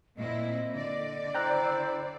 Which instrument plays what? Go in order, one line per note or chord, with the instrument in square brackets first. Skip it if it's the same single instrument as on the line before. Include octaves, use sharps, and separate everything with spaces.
[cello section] A#2 C4 E4 [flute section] D#5
[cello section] D3 D5
[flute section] E4 C5 E6 [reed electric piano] G5 A#5 F#6